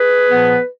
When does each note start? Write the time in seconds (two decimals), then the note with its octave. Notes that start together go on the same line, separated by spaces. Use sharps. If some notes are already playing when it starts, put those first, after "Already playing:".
Already playing: G#4 B4
0.28 A#2 F3 B3